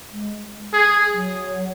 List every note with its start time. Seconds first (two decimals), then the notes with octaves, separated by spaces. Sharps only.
0.13 G#3
0.73 G#4
1.13 F#3